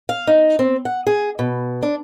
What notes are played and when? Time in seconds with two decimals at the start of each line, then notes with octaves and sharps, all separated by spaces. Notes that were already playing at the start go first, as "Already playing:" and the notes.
0.09 F5
0.27 D#4
0.59 C4
0.85 F#5
1.07 G#4
1.39 B2
1.83 D4